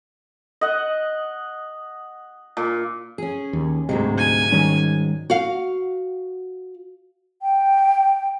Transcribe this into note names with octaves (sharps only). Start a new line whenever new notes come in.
D#5 F#5
A#2
C#4 G#4
D#2
D2 G#2 C3 F#3 G#3
G#5
D#3 G3 C#4
F#4 F5
G5